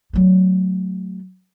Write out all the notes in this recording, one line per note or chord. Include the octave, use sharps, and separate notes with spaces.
F#3 A3